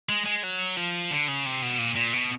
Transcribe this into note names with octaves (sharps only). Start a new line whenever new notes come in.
G#3
G#3
F#3
F3
D3
C#3
C3
B2
A#2
A#2
B2